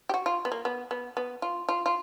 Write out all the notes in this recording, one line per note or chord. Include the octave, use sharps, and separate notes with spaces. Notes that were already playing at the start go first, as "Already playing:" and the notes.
G4
F#4
F4
B3
A#3
B3
B3
B3
F4
F4
F4